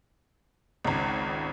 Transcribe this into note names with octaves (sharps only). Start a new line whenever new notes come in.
G#1 C#2